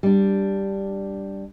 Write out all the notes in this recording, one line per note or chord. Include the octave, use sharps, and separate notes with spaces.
G3 D4